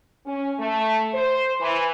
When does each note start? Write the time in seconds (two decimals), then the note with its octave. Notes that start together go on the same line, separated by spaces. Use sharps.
0.27 C#4
0.60 A3
1.14 C5
1.61 E3